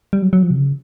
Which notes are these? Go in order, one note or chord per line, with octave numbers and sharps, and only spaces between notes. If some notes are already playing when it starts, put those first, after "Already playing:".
G3
F#3
F#3
F3
C3
C#3